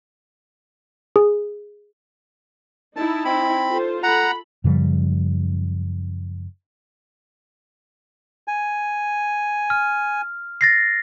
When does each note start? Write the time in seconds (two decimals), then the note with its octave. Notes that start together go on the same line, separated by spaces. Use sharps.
1.16 G#4
2.96 D#4 E4 A5
3.25 C4 B5
3.69 F4 A4 C5
4.03 A4 F#5 A#5 B5
4.64 F#2 C#3 F3 G3
8.48 G#5
9.70 F6
10.61 A6 A#6 C7